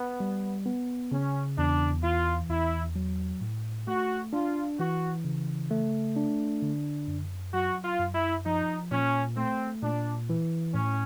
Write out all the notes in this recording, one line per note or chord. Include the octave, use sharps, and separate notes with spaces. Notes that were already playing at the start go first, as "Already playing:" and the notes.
Already playing: B3
G3
B3
C#3 C#4
E2 D4
E3 F4
E2 E4
F#3
A2
A3 F#4
D4 F4
E3 F#4
C#3
A3
D4
D3
F#2
F#3 F#4
F4
F#2
E4
F3 D#4
A#2 C#4
A3 C4
A#2 D4
E3
A2 C#4